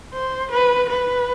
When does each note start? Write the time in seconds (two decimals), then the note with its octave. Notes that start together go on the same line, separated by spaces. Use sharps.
0.13 C5
0.51 B4
0.89 B4